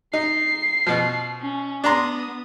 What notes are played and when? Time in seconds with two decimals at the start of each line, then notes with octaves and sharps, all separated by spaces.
0.13 D#4 C7
0.86 B2 F3
1.41 C#4
1.84 B3 D4 A#5 C6 D#6